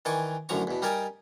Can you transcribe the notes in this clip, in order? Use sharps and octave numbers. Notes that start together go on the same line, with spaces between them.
D#3 E3 D5 G#5 C#6
F#2 A2 D3 F3 A#5 C#6
E2 B2
G3 D#4 G4 A#4 D5 G#5